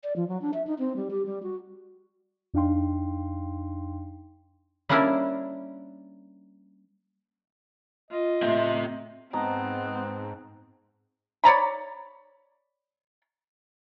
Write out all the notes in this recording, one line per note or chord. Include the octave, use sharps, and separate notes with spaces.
D5
F3
F#3
D4
E5
D#4
C4
G3
G4
G3
F#4
F2 D4 D#4 F5 G5 C6
G3 A#3 C#4 D4 E4 A#4
F4 D#5
A2 A3 C4 E5
G#2 B3 C4 D#5 A5 A#5
C#5 D5 A#5 B5